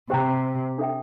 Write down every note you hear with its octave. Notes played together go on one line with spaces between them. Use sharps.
C3 G4 C5 G5 A#5
D4 A4 E5 G5